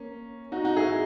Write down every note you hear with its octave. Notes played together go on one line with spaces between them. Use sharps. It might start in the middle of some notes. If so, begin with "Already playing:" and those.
Already playing: A#3 C#4
D#4 F#4
D#4 F#4
E4 G#4